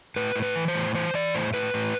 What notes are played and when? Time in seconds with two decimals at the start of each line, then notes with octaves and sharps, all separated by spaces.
0.16 A2 B4
0.36 A2
0.42 B4
0.56 E3
0.68 C5
0.75 A2
0.95 E3 C5
1.14 E3 D5
1.35 A2 C5
1.54 A2 B4
1.74 A2